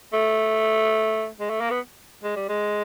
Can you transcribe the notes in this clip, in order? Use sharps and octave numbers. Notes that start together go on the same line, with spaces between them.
A3
G#3
A3
A#3
B3
G#3
G3
G#3